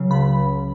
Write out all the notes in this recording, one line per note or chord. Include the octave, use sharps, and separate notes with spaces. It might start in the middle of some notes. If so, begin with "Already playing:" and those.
Already playing: C#2 C#3 F#3
C#2 B5